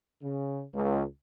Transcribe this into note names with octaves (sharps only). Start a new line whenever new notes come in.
C#3
C#2